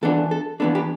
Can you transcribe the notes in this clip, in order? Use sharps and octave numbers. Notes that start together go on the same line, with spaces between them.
E3 B3 D4 A4
A4
E3 B3 D4 A4
G4